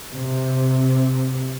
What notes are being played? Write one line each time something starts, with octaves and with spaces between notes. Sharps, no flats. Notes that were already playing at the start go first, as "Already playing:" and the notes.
C3